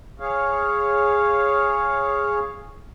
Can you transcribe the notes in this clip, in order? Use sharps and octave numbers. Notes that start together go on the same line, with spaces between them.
G#4 C#5 F5